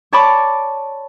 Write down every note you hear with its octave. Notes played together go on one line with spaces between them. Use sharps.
C#5 D5 A5 B5 C#6 D6